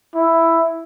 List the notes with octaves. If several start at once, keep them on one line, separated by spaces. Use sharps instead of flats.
E4